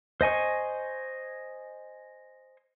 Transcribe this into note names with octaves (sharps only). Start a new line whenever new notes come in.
C5 D#5 G#5 C#6